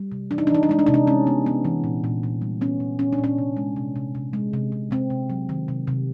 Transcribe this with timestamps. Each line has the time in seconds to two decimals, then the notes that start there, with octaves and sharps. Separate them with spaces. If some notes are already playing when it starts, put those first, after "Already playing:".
Already playing: G3
0.12 C3
0.31 E3 D4
0.38 D#4
0.47 D4
0.51 E3 D#4
0.63 D4
0.69 G#3 D#4
0.79 D4
0.87 C3 D#4
0.94 D4
1.07 G#3 C#4
1.27 B3
1.46 B3
1.65 E3
1.84 A#2
2.04 A#2
2.23 A#2
2.42 G3
2.61 B3 C#4
2.80 A#2
2.99 A#2 C#4
3.13 D4
3.18 A#2
3.24 C#4
3.38 C3
3.57 G#3
3.76 C3
3.96 C3
4.15 C3
4.33 G#3
4.53 C3
4.72 C3
4.91 C3 C4
5.10 C3
5.30 F#3
5.49 D#3
5.68 C3
5.87 C3